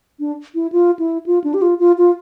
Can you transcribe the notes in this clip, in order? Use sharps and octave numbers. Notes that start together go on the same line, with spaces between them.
D4
E4
F4
E4
F4
D4
G4
F4
F4
F4